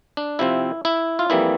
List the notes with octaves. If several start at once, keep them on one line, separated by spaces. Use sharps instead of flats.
D4
C3 F3 C4 E4
E4
F4
F2 E3 G3 A#3 E4